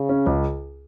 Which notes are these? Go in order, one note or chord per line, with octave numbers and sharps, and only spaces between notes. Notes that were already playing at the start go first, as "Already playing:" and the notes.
Already playing: C#3
C#4
C#2